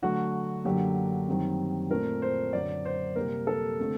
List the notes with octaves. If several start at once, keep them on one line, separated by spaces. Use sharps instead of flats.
D3 F#3 A3 F#4
F#2 D3 F#3 A#3 G4
F#2 D#3 G3 C4
A#2 A3 C4 A#4
C5
F#2 D3 F#3 D5
C5
C3 G3 A#3 A#4
A4
D3 A3 C4